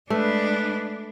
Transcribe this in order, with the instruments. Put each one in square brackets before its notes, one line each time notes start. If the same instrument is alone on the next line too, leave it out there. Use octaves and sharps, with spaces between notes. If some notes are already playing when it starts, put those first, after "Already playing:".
[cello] G#3 D4 [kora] A3 [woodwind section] B4